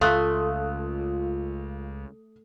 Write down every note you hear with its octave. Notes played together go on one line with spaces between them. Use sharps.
C#2 A3 F4 D#6 F#6